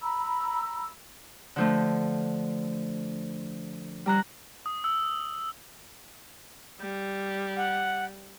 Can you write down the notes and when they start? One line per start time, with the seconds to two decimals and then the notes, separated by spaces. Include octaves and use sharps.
0.02 A#5 B5 E6
1.56 D3 F3 A3
4.06 G3 A#5 F#6
4.66 D#6
4.84 E6
6.81 G3
7.57 F#5